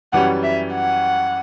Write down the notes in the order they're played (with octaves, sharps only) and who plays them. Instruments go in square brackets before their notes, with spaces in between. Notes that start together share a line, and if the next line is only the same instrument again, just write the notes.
[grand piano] F#2 E3 G3 C#4 G4 [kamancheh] F#5
[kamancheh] E5
F#5